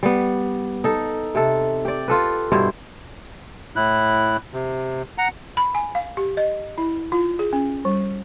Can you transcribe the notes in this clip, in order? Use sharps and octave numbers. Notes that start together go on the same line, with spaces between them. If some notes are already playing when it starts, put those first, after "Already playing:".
G3 B3
D#4 A4
C3 A4
G4 D5
F4 A4 B4
G2 B2 E4 C5
A2 E4 F#6
C3
F#5 A#5
B5
G#5
F5
G4
D#5
E4
F4
G#4
C#4
G3